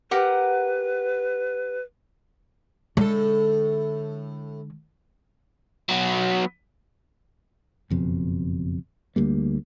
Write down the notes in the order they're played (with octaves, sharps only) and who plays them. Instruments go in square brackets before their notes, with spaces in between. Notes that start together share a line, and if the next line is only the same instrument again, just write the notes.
[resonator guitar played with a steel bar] G4 A#4 F#5 [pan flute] B4
[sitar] A2 A4 [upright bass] D3 G#3
[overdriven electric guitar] F#3 B3
[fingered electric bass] F#1 F2 B2
D2 G3 A#3